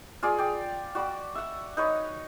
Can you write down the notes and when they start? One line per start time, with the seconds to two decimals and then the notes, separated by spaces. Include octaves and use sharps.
0.23 F4 G#4 D5
0.38 D5 G5
0.95 F#4 D5 B5 D6
1.35 E5 F#5
1.77 D#4 B4 C#5